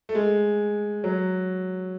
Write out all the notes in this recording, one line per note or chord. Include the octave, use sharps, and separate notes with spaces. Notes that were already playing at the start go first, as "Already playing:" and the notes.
A3
G#3
F#3